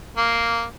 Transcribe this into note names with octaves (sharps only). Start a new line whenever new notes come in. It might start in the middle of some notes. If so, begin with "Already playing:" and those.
A#3